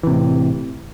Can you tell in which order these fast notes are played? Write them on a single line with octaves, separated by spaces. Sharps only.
E3 C3 A2